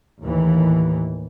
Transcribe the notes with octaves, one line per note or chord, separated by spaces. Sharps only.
D#2 A2 E3